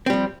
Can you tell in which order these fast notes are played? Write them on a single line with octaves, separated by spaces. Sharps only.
C4 G3 F3